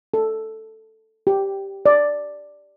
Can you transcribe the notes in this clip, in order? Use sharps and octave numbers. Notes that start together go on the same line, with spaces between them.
A4
G4
D5